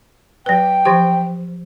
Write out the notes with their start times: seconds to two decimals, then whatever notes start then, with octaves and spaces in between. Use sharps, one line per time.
0.46 F#3 B4 G5
0.85 E3 F3 G4